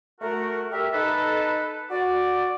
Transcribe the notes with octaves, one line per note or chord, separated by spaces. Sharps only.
A3 F#4 A#4
G4 A#4 E5
D#4 A4 B4
F#4 D5